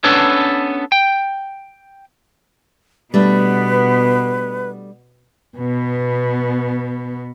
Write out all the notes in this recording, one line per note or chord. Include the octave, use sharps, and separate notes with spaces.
B3 C#4 D4 A4 B4 C#5
G5
B2 G3 A3 B3 D4 B4
B2 B3